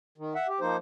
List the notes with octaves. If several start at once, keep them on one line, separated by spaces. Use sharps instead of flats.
D#3
E5 F#5
G4
F3 A#3 D#4 C5